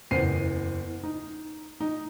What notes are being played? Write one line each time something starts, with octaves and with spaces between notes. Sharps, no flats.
F#1 E2 C5 C7 D#7
D#4
D#4